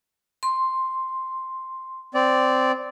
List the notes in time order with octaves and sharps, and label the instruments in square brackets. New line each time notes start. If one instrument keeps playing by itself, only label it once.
[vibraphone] C6
[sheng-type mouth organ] C4 D5